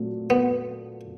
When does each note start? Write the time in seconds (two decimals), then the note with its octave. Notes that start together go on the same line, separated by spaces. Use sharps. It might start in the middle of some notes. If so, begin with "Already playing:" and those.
Already playing: A#2 F#3 A3 C4
0.30 B3